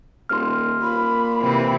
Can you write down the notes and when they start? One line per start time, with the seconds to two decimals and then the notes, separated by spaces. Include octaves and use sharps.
0.29 D#1 C6 F6
0.82 A#2 B5
1.41 C3 E3 C4